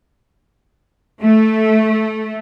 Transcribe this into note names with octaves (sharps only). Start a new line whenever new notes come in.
A3